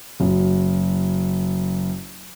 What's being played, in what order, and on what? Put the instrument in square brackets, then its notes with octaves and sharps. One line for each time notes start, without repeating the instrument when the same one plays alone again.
[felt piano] F#1 F#4